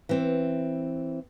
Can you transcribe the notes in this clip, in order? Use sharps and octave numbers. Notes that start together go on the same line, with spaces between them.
E3 C4